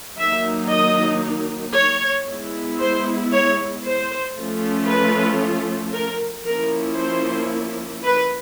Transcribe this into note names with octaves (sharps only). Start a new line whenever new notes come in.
D#3 F#3 A#3 D#4 E5
D#5
C#5
G#3 B3 E4
C5
C#5
C5
F3 A3 C#4 F4
B4
A#4
F3 A#3 C#4 E4 A#4
C5
B4